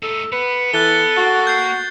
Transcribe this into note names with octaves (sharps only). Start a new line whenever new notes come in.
A3 D#4 A4
B3 B4
E3 A4 F#6 A6 G7
A#3 F#4
G6 C7